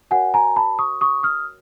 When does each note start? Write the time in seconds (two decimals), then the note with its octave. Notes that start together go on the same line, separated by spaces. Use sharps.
0.11 F#4 A#4 C#5 F#5 G#5
0.34 G#5 A#5
0.56 A5 B5
0.79 C#6 D#6
1.01 C#6 D#6
1.23 D#6 F6